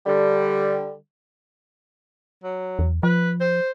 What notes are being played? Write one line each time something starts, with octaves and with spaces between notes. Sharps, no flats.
D3 G3
F#3
E2
F3 B4
C5